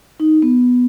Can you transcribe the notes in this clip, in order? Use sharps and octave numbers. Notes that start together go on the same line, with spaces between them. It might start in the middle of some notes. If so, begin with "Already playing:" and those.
D#4
B3